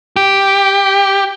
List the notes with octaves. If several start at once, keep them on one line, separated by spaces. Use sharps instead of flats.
G4